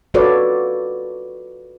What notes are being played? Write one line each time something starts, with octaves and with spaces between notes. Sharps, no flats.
F4 F#4 A4 B4 C#5 D5